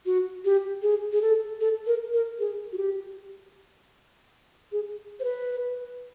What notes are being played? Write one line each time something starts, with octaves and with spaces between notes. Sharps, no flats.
F#4
G4
G#4
G#4
A4
A4
A#4
A#4
G#4
F#4
G4
G#4
C5
B4